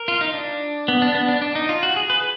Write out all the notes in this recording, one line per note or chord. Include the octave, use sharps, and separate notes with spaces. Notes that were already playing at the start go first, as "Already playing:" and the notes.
Already playing: A#4
F4
D#4
D4
B3
D4
B3
D4
D4
D#4
F4
F#4
G#4
B4